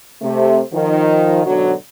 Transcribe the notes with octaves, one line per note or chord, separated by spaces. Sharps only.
C3 A3
D#3 F3
G#2 B2 D3 F#3